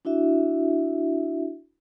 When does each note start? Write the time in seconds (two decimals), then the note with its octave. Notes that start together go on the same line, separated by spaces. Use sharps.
0.05 D4 E4 F#4 E5